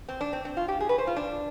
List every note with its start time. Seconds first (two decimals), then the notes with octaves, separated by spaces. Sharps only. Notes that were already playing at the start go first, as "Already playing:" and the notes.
0.08 C4
0.21 D4
0.33 C4
0.45 C4
0.57 F4
0.68 G4
0.80 G#4
0.89 B4
0.98 C5
1.07 F4
1.16 D4